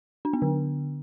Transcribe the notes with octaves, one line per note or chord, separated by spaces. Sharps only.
D4
B3
D3